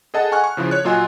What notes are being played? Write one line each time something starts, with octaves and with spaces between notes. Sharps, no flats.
G#4 A4 D#5 F#5 A5
F#5 G#5 C#6 F6 F#6
C#6
C#3 F3 E4 F4
C#5 F#6
A#2 F#3 F4 D#5 G#5